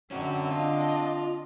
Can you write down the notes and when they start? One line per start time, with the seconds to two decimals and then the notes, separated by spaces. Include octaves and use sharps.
0.11 D3 C4 C#4 F#4
0.51 D4 F4 D#5